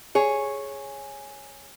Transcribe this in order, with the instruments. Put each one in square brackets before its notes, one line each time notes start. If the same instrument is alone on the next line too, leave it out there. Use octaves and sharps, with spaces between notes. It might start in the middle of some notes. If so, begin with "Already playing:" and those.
[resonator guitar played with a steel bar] G#4 C#5